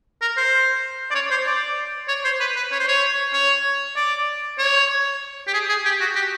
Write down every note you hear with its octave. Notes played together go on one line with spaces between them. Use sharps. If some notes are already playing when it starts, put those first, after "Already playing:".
A#4
C5
D5
C#5
C5
D5
C#5
C5
B4
B4
C#5
C5
C#5
C#5
D5
C#5
G4
G#4
G#4
G4
F#4
G4